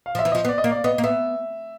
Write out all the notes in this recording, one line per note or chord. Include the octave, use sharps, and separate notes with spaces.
F5
F3
E5
E3
F3 D#5
B3
D5
D#5
A#3
D5
B3 D#5
A#3
B3 E5